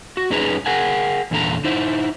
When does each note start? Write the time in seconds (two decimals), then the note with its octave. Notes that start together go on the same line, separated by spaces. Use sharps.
0.17 F#4
0.30 F#2 C#4 D#4 G#4 B4 A#5
0.66 G#4 A#4 F#5 G#5
1.31 E2 A#2 D3 A4 A#5
1.65 D#4 E4 C5